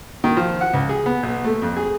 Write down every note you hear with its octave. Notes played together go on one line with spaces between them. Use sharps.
D#3
F3
F#5
C#2
G#4
B3
B1
A3
F2
G#4